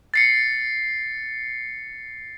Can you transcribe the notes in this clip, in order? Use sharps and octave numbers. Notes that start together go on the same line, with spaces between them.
A6 C7 C#7